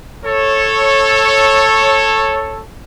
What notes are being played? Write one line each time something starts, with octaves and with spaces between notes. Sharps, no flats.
A4 C#5